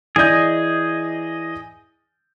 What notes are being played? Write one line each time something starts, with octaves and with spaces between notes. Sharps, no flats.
E3 G#4 D5 D#5 G6